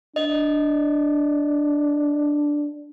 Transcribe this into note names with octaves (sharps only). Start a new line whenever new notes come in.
D4 D#5